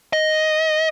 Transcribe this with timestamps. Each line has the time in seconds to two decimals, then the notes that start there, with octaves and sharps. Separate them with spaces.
0.13 D#5